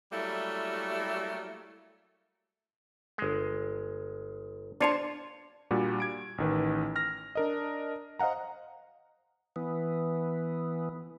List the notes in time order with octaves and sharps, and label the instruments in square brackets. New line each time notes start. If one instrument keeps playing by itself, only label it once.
[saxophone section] F#3 G3 A3 A#3 E4
[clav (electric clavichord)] G1 G#3
[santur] D4 C5 A5 [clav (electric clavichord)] F4 C#5
[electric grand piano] A#2 G3 D4 F#4
G#6 D7
A1 D#3 B4
F6 A#6
D4 A#4 D#5
C5 D#5 F5 F#5 A#5
[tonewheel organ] E3 B3